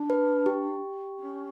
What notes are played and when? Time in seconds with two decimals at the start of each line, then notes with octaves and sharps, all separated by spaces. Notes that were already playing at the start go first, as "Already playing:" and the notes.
Already playing: D4
0.10 B4
0.46 G4
1.18 C#4